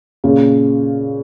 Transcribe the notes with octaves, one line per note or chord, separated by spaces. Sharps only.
A#2 C#3